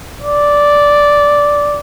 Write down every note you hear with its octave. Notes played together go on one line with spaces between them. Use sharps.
D5